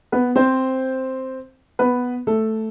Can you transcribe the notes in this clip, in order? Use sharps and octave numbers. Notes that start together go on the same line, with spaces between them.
B3 B4
C4 C5
B3 B4
A3 A4